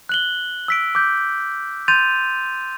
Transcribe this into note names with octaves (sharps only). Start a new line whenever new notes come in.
F#6 F#7 G7
E6 B6 D7
D6 G6
C6 G6 A6 D#7 F7